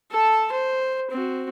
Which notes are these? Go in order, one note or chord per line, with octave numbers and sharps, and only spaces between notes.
A4 A5
C5
C4 F#4